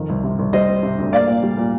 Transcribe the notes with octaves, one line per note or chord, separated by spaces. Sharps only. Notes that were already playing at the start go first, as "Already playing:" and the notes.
Already playing: F2 D#3
C2
C3
C2
G3 C5 D#5
C4
C3
D2
A#3 D5 F5
A#2
G3
A#2